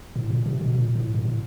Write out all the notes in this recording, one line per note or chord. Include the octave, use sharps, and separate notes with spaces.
A2
A#2
C3
B2
A#2
A2
A2
A2